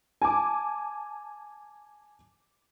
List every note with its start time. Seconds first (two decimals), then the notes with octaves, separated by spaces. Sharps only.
0.22 G#5 A5 D6